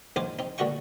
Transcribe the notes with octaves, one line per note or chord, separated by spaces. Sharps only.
A#1 D#3 F4 C5 G#5 D6
C4 D#4
A#2 D3 F#4 D#5 G5 C#6